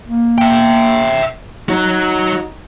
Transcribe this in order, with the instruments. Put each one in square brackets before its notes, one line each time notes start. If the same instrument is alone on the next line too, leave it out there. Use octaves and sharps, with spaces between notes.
[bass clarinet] A#3
[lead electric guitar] E5 G5
[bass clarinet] D#4 [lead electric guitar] F#4 C#5